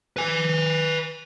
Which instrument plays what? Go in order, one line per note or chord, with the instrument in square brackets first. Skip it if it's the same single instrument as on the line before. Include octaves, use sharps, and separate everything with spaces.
[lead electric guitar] B4 G#5